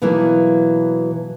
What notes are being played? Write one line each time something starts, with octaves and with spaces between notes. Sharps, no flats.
B2 E3 F#3 A#3 E4